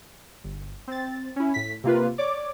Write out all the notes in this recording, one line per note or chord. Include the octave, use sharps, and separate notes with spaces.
G1
C4 A6
C#4 E4
A2 B6
C3 A#3 F4 B4
C#5 D5 D6